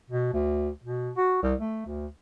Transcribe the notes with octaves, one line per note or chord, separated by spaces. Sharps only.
B2
D2
B2
F#4
C2
A3
D2